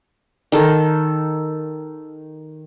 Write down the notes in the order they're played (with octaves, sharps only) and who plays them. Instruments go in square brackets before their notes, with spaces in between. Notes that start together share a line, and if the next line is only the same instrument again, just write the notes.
[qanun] D#3 A4